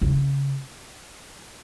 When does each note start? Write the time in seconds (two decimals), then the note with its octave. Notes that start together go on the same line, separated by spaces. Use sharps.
0.01 C#3